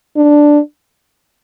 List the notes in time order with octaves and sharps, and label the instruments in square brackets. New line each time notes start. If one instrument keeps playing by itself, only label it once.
[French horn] D4